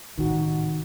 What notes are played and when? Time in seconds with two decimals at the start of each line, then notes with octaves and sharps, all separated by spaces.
0.18 A1 G#2 C3 D#3 D#4 F#4